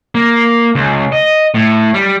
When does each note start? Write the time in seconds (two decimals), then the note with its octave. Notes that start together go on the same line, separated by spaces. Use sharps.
0.15 A#3
0.75 C#2
1.12 D#5
1.54 A2
1.94 G3